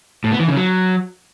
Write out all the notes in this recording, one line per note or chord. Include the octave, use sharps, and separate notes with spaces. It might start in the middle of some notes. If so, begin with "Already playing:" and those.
A2
B3
E3
C#3
F#3